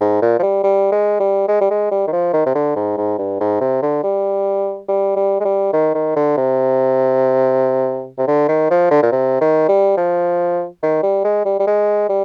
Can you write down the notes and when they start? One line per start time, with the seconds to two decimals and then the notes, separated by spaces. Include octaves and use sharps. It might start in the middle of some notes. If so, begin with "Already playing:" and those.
0.01 G#2
0.22 A#2
0.39 F3
0.43 G3
0.63 G3
0.92 G#3
1.20 G3
1.48 G#3
1.61 G3
1.70 G#3
1.91 G3
2.07 D#3
2.12 F3
2.33 D#3
2.46 C3
2.55 D3
2.76 G#2
2.97 G#2
3.19 G2
3.40 G#2
3.61 C3
3.82 D3
4.04 G3
4.88 G3
5.16 G3
5.40 G#3
5.45 G3
5.73 D#3
5.94 D#3
6.16 D3
6.37 C3
8.18 C3
8.27 D3
8.48 D#3
8.70 F3
8.91 D3
9.03 A#2
9.12 C3
9.41 D#3
9.69 G3
9.97 F3
10.83 D#3
11.03 G3
11.24 G#3
11.45 G3
11.59 G3
11.67 G#3
12.09 G3